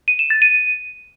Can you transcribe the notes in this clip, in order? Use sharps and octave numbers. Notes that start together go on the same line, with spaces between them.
D#7
E7
A6
D#7